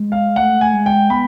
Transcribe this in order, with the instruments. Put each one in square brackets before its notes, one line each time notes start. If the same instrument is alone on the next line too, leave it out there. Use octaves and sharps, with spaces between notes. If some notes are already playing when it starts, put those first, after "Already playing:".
Already playing: [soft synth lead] G#3
[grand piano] F5
[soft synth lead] A3 [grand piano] F#5
[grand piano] G#5
[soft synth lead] G#3
[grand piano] G5
[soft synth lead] B3 [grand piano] B5